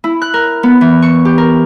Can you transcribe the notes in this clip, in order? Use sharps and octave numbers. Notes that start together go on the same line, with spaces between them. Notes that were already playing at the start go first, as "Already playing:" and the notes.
E4
F#6
A#4
B3
E3
C#6
G4
A#4